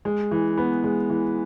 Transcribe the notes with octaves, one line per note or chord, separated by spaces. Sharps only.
G#3
E3
B3
G#3
E3